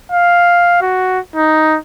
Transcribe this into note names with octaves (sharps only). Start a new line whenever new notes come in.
F5
F#4
D#4